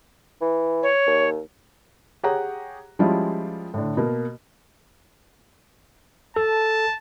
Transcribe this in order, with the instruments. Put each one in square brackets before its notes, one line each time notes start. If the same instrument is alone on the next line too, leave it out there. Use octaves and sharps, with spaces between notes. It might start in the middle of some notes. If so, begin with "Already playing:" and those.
[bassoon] E3
[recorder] C#5
[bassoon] D#2
[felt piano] G4 G#4 C#5 F#5 A#5
F3 G3 G#3 C#4 E4 F4
A2 D3
B2 A#3
[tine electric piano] A4 [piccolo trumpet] A5